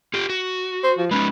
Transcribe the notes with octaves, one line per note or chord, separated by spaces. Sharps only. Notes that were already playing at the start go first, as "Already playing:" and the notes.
F4 G4
F#4
C5
F3
G#3 C#4 D#4 B4